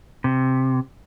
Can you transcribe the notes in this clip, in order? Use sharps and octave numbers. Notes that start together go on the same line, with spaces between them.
C3